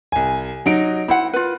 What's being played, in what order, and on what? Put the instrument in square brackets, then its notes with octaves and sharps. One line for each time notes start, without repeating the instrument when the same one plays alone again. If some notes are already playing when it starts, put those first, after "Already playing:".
[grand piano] C2 G#5
F#3 D#4 D7
[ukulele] E4 C5 F#5 [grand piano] B5
[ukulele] F4 B4